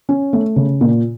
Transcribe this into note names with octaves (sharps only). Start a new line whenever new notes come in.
C#4
A3
C#3
A#2